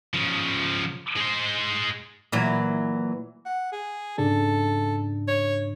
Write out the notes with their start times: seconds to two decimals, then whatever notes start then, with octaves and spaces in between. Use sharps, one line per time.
0.14 C#3 F3
1.17 G#3 C5
2.32 A#2 E3 F#3
3.45 F#5
3.72 G#4
4.18 G#2 C#3 D4 A4
5.28 C#5